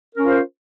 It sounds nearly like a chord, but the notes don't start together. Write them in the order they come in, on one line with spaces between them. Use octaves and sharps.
A#4 C#4 F4 C5